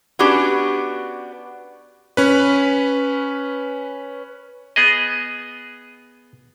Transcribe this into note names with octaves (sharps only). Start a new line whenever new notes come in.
B3 C#4 D4 F#4 G4
C#4 B4
B3 G#4 D#5